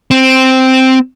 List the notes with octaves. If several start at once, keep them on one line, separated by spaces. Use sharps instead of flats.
C4